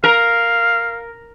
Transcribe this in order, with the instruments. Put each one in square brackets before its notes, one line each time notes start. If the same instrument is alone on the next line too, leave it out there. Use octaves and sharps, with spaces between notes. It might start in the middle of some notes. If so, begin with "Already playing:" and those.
[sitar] A#4 [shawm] F5